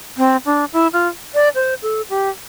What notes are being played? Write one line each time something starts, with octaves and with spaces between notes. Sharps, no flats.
C4
D4
E4
F4
D5
C5
A4
G4